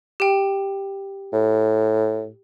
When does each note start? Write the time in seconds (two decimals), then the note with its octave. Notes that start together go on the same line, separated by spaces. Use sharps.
0.20 G4 G5
1.33 A2